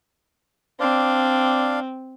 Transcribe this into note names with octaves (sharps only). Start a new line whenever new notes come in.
C4 D4 D5 F5